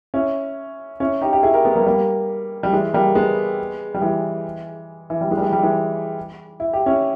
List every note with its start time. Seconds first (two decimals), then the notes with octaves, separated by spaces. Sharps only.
0.14 C#4 E4
1.00 C#4 E4
1.21 D#4 G4
1.33 G4
1.43 E4 G#4
1.54 G4 A#4
1.65 G#3 B3
1.76 G3 A#3
1.86 G3 A#3
2.63 G3
2.73 E3 G#3
2.93 G3 A#3
3.15 G#3 B3
3.94 G3
4.01 E3 G#3
5.10 E3
5.21 G3
5.31 E3 G#3
5.37 G3
5.41 E3 G#3
5.52 G3
5.63 E3 G#3
6.60 E4
6.73 G4
6.86 C#4 E4